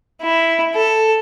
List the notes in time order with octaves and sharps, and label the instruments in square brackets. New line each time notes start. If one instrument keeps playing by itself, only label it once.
[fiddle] E4
A4